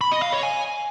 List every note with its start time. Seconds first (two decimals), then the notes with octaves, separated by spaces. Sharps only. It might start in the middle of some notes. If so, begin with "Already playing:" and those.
0.01 B5
0.12 D#5
0.22 F5
0.33 C#5
0.43 G#5